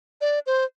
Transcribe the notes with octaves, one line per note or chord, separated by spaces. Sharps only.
D5
C5